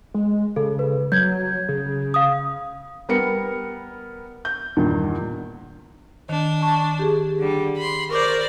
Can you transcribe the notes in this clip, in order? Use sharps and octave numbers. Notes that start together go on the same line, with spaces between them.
G#3
C#3 A4
B4
F#3 G6 G#6
C#3
F5 D#6
G3 B3 A#4 C#7
G6
E2 G2 A#2 D#3
D#3 D4
A5 C#6
G4 G#4
D3 G3
B5 C6
A#4 C5 D5 C#6 D6 G6